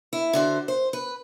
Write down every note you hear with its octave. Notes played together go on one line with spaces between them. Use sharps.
E4
D3 F#4 C5
C5
B4